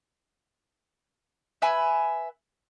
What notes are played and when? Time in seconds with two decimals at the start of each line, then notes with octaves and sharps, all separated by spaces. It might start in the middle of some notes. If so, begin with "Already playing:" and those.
1.62 B4 E5 G#5 B5